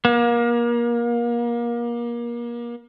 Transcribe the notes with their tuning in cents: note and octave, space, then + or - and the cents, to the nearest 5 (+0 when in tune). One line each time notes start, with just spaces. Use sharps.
A#3 +30